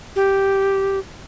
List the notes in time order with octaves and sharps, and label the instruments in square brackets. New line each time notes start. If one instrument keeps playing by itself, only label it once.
[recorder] G4